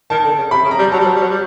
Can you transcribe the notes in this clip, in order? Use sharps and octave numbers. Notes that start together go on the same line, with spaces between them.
D#3 A5
D3
C#3
C3 B5
C#3
A#5
G3
F#3 A5
G3
F#3
G3
F#3
G3